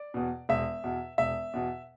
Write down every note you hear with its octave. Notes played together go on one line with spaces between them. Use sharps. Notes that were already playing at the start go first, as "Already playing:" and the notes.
Already playing: D5
E2 B2
E1 E5
E2 B2
E1 E5
E2 B2